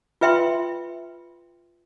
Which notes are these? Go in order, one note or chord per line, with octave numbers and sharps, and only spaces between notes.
F4 B4 E5 G5 C6